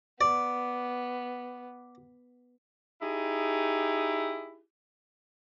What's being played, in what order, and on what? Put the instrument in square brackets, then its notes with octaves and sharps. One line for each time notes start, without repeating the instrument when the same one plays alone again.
[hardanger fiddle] B3 [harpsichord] D5
[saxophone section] D#4 E4 G4 G#4